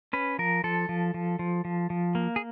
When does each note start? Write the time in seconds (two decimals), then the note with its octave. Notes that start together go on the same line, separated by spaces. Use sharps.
0.13 C#4 B4
0.39 F3 A#4
0.64 F3 A4
0.89 F3
1.14 F3
1.39 F3
1.65 F3
1.90 F3
2.15 A#3
2.36 G#4